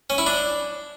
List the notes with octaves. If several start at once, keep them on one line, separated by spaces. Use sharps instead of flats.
C#4
E4
D4